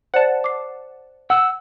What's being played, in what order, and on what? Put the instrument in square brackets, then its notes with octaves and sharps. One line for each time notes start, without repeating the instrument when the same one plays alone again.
[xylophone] C5 D5 [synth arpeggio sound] F#5 A5
[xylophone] D6 C7
[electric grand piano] F#5 [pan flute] E6